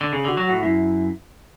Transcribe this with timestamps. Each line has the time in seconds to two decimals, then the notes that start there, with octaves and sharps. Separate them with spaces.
0.01 D3
0.12 C#3 G#4
0.24 D3 F#4
0.37 F#3
0.46 A2 F#4
0.62 F#2 E4